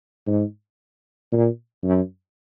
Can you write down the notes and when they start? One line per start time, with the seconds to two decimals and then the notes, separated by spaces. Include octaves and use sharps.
0.27 G#2
1.32 A#2
1.83 F#2